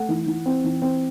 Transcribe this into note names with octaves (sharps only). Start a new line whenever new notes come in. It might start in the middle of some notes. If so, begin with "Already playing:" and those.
Already playing: A3 F#5
E3
E3
C4
E3
C4